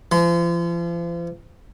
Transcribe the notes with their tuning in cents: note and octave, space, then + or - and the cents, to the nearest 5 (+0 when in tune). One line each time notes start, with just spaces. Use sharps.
F3 -40 C6 -35